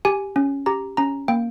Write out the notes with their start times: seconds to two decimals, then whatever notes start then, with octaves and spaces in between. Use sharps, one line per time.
0.05 G4 G#5
0.36 C#4
0.66 G4 A#5
0.97 C#4 A#5
1.28 A#3 G5